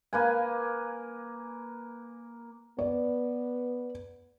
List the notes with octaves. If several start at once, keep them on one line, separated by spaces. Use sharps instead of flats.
A#3 B4 G#5
B3 D5